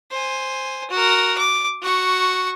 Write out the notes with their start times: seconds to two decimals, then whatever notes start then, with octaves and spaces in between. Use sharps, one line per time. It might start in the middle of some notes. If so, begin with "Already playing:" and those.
0.11 C5 G#5
0.90 F#4 A#4
1.38 D6
1.83 F#4 C#6